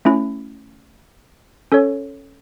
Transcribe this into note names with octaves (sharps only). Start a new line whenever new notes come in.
A3 C#4 E4
C#4 A4 C#5